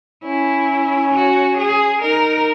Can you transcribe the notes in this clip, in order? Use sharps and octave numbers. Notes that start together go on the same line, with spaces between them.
C#4 E4
F#4
G#4
D#4 A#4